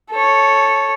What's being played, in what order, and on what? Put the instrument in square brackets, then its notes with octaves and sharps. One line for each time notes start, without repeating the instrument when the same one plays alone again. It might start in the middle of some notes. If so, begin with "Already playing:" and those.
[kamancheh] A4 C#5